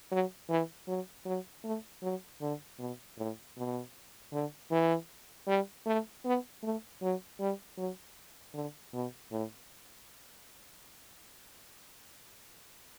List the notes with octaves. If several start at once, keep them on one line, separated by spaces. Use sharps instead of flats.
F#3
E3
F#3
F#3
A3
F#3
D3
B2
A2
B2
D3
E3
G3
A3
B3
A3
F#3
G3
F#3
D3
B2
A2